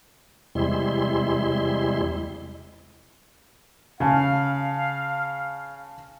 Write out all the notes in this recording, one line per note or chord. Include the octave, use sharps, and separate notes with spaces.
E2 C3 G3 G#3 E4 C6
C#3 F5 G#5 A5